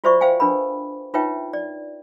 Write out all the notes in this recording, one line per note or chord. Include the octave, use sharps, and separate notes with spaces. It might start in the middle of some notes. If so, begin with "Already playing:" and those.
F4 F#4 C5 D5 E5 C#6
C5 F5 G5 G#5
D4 A#4 B4 B5
D#4 F4 B4 C#5 E5 G5
D5